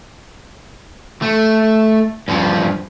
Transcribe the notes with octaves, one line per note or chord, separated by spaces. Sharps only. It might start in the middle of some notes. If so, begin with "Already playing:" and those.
A3
G2 F3